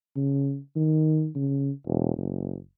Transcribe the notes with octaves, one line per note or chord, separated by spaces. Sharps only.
C#3
D#3
C#3
E1
F#1